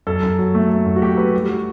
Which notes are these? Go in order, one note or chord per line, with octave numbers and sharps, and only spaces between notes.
F#2 A4
F#2
F#3
A3
A3
F#2
F#4
A3 G4
A3 B4
G3 G4
F#4